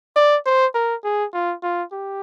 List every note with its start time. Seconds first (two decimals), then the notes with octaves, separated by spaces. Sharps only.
0.16 D5
0.46 C5
0.74 A#4
1.04 G#4
1.34 F4
1.62 F4
1.92 G4